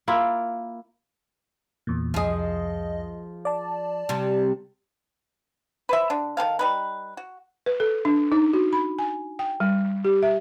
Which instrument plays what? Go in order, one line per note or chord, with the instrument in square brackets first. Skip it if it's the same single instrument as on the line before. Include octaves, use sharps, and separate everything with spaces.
[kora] A#3 E4 F4
[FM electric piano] E2 A#2
[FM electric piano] C2 F2 D#5 [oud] F3 G#4
[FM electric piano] D5 A5
[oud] C3 G3
[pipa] B4 C5 E5
D3 D4
D#3 C4 A4 F5
G3 D#4 B4
F#4
[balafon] B4
A4
D4
D#4
F#4
B5
G#5
G5
G3
G4
E5